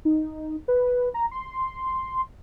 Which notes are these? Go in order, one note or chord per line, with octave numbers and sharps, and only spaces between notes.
D#4
B4
A#5
C6